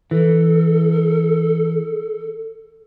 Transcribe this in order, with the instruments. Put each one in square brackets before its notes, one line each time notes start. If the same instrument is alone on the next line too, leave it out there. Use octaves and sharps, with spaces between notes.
[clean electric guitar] E3 [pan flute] A4